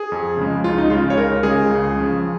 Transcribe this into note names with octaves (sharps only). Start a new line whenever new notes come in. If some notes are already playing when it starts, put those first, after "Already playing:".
Already playing: G#4
F2
C#3 F3 G#3
C#2 F4
D#4
C#3 G#3 F4
C#5
C#2 A#4
C#3 G#3 G#4
C#2
C#3 F3